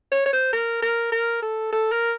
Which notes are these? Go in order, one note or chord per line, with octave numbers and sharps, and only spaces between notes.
C#5
C#5
C5
A#4
A#4
A#4
A4
A4
A#4